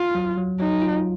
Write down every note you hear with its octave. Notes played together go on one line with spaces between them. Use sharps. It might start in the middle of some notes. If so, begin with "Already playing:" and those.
Already playing: F4
F#3
F#3
F#3 D#4
F4